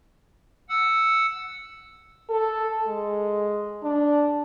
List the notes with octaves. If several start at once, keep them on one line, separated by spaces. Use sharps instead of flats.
F#5 E6
A4
G#3
D4